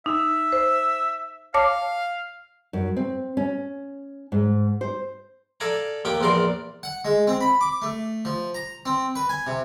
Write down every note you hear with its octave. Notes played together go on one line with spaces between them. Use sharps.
D#4 E5
C5
C#5 F5 A5 D6
F#2
C4
C#4
G#2
C5
A4 D5 F5 G#5 A#5
D#2 A#3 G4 G5
A#1 E2 A#4 D5 C6
F#5
G#3
C4
B5
D6
A3
F3
A#5
C4
B4
G#5
C3